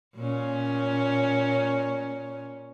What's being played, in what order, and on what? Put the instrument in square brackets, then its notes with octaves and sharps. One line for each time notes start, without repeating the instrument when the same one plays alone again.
[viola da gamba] A#2 C#4